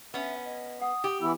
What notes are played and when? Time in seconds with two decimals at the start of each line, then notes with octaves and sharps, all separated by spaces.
0.14 B3 C#4 E5
0.45 D#5
0.82 F#5 D#6
1.04 G4
1.21 E3 B3 E4 E6